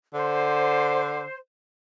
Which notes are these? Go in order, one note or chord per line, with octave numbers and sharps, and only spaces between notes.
D3 C5